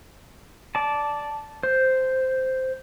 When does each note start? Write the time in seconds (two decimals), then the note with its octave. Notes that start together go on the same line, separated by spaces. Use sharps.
0.75 D5 A5
1.63 C5